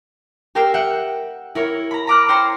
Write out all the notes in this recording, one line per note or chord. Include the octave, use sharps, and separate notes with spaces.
G4 A#4 G5 E6 C7
E5 F#5 G5
E4 A#4 C#5
A#5 B5
A#5 B5 D6 F6 F#6
C5 C#5 G5 A#5 C6